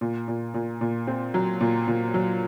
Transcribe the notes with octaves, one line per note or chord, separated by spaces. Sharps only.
A#2
A#2
A#2
A#2
C4
F#3
A#2
A#2
F#3